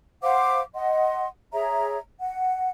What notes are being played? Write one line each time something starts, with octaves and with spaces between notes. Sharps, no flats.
C5 F5 F#5 D6
D#5 F#5 C6
G#4 C#5 E5 A#5
F#5